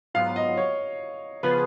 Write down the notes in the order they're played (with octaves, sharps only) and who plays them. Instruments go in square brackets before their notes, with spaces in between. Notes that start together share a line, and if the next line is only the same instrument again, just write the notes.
[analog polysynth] G#2 F#3 B3 F4 [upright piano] F5
[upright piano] D#5
C#5
[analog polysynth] C#3 F3 B3 F4 G#4 [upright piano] B4